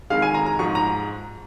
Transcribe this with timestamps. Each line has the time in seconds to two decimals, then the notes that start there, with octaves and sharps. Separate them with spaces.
0.10 F2 D#3 G#3 F5
0.22 G#5
0.34 A#5
0.46 A#5
0.59 G#2 F3 G#3 C#6
0.75 A#5